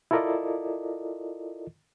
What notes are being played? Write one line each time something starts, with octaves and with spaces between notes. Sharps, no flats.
E4 F4 A4 A#4 D5 D#5